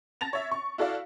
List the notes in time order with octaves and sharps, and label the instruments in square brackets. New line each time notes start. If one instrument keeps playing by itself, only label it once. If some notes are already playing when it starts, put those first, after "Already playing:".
[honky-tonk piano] A5 A6 A#6 F7
C#5 E5
C#6
E4 F#4 A4 D5 F5